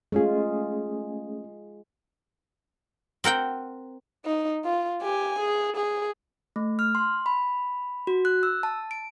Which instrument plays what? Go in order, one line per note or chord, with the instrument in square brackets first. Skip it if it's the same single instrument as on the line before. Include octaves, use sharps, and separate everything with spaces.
[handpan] G#3 F4 [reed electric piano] A3 C#4 G#4
[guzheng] C4 A#4 F#5 G5
[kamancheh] D#4
F4
G4 G#5
G#4
G#4
[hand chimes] A3
F6
C6
B5
F#4
F#6
E6
A5
D7